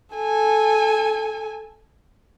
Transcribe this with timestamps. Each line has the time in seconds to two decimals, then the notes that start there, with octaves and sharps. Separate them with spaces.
0.15 A4 G#5